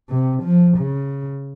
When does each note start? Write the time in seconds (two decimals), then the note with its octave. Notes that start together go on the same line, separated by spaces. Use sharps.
0.10 C3
0.44 F3
0.78 C#3